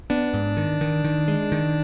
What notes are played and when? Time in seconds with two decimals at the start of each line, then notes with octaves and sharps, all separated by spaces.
0.10 B3 D4
0.34 G#2
0.57 D#3
0.81 D#3
1.04 D#3
1.28 G#3
1.52 D#3